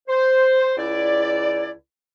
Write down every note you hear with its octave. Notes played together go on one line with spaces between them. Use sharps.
C5
C#2 E4 D5